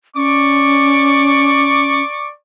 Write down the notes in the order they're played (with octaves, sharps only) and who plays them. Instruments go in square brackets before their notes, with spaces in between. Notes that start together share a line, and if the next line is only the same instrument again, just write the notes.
[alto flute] C#4 [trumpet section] D5 C#6 D6